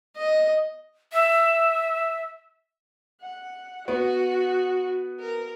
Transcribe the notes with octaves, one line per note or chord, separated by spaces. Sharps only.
D#5
E5
F#5
B3 F#4
A#4